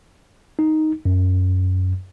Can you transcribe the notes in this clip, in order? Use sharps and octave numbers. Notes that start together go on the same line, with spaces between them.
D#4
F#2